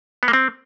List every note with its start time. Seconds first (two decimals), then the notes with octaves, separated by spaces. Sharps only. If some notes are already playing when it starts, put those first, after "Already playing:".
0.23 B3
0.28 A#3
0.33 C4